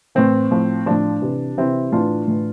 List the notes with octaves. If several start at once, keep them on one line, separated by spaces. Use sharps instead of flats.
A2 E3 C4
A2 F3
A2 F3 D4
C3 E3
C3 E3 C4 E4
A2 E3 D4 F4
A2 E3